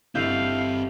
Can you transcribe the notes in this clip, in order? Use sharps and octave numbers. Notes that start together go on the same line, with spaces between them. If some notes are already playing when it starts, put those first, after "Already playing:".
G1 C4 E4 D#5 F5 G6